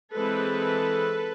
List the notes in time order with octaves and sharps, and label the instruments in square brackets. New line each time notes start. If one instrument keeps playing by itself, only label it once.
[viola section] E3 G#3 C4 A4 B4